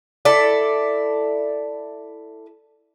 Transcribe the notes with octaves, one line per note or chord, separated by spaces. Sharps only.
E4 A4 D5